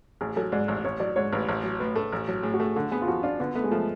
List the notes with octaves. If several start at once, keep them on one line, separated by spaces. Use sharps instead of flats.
A1 G#4
F#3 A4
G#2 D5
A1
A1 C#5
F#3 D5
G#2 C#5
A1 B4
A1
F#3
A2 B4
A3 A4
A1
F#3
A2 G#4
F#4
A3 G#4
D3 A4
B3 G#4
F4
F3 F#4
D4 F4
D3 B3
A3 B3
G#3
F3 A3